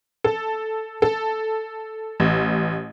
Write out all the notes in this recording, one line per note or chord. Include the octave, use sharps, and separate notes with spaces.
A4
A4
A1